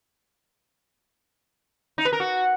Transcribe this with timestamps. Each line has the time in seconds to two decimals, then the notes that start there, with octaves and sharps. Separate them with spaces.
1.98 D#4
2.05 B4
2.13 A#4
2.20 F#4